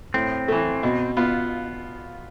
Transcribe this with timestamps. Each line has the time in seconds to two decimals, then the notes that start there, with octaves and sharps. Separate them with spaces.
0.14 A2 C4
0.48 E3 A3
0.83 B2
1.17 B3 F4